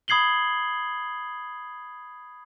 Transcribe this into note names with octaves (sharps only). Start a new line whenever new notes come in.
B5 D#6 G#6 C7 F#7 G7